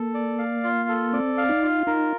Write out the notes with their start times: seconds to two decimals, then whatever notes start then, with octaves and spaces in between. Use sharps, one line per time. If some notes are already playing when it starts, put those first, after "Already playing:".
Already playing: A#3 A4
0.14 D5
0.39 F5
0.64 F4
0.89 A4
1.13 C4 D5
1.38 F5
1.49 D#4
1.63 F4
1.87 D#4 A#4